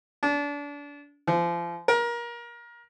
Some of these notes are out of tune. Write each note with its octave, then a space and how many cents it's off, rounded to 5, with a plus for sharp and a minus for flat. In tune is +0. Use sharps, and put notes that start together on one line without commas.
D4 -30
F3 -30
A#4 +25